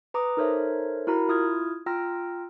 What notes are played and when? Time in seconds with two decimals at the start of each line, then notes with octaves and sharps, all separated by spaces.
0.14 B4 A#5 D6 D#6
0.37 D#4 A4 A#4 C5 C#5 E5
1.07 E4 F#4 A#4 A#5 B5
1.28 E4 F4 D#6 F6 G#6
1.86 F4 G5 A#5 E6 F6 A#6